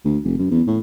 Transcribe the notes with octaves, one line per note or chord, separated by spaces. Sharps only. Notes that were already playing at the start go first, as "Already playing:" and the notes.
D2
F1
F#2
E2
A2